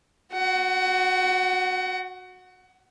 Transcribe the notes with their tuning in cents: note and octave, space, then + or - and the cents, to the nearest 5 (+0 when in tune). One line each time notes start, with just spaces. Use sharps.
F#4 -15 F#5 +25